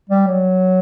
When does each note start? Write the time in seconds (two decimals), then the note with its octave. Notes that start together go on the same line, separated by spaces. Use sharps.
0.09 G3
0.27 F#3